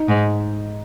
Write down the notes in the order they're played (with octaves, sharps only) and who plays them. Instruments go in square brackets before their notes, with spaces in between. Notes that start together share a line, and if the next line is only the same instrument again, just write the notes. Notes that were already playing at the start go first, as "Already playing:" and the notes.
Already playing: [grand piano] D#4
[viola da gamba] G#2